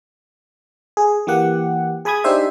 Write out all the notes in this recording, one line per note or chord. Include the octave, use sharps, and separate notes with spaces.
G#4
E3 A#3 G4 F#5
G#4 G#5 B5 D#6 G#6
D4 D#4 G4 C5 E5